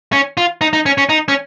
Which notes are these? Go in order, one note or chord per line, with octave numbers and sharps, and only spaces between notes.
C#4
F4
D#4
D#4
C#4
C#4
D#4
C#4